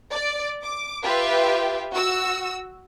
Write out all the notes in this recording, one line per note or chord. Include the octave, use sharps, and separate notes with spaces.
D5
D6
F4 G4 B4 E5
F#4 E6